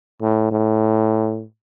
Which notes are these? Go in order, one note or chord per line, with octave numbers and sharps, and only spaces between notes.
A2
A2